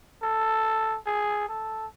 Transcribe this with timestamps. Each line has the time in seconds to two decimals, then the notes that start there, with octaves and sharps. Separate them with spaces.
0.22 A4
1.06 G#4
1.49 A4